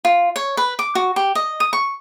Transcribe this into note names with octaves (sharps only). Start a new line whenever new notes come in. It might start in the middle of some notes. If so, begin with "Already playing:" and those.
F4
C#5
B4
D6
F#4
G4
D#5
D#6
C#6